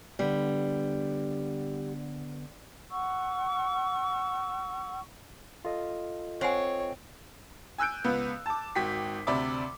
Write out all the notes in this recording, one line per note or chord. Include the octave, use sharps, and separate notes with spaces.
D3 G3 B3
F#5 C#6 E6
F4 A4 D#5
C4 C5 C#5 F#5 G#5
G#5 E6 F#6 G6 D7
C#2 B3 B4
A5 D6
G#1 F#4 G5 B6
D2 C3 D5 E5 B5 D6